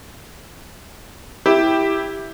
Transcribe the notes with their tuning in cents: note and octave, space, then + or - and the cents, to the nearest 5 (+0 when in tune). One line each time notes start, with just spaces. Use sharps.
E4 -5 G4 +0